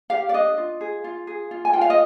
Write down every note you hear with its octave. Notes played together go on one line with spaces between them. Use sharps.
G4 F5
D5
D4 D#5
F4
G#4
F4
G#4
F4
G#5
F4 G5
F5
D#5